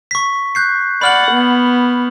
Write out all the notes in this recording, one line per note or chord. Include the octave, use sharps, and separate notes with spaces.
C#6 B6
F#6 G6 C7
D5 F#5 B5 F6 F#7
B3